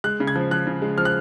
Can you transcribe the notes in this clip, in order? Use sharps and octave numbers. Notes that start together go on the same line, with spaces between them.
G#3 F#6
C#3
G#6
F3
F3 F#6
C#3
G#3
F3 F6
F#6